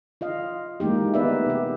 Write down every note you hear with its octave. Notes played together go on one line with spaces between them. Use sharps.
F4 D#5 F5
E3 G#3 A#3 D#4 G4
A3 B3 D#4 B4 D5 E5
C3 G4